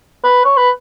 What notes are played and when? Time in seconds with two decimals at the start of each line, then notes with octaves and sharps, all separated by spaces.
0.24 B4
0.44 C#5
0.57 B4